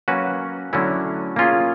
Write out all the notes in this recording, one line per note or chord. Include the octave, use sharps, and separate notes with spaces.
F#3 A#3 C#4 F#4 B4
D3 F#3 A3 C#4 E4
A#3 C#4 F4 G#4